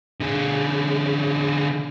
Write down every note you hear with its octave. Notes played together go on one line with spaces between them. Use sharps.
D3 G#4